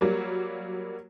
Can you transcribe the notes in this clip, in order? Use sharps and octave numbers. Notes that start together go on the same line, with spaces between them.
F#3 G3 A#3